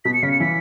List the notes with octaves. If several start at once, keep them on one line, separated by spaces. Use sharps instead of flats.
B2 B6
C#7
C#3 B6
C#7
E3 B6